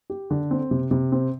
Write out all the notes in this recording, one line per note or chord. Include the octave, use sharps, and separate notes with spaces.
G4
D3
C4
C3
C3
C4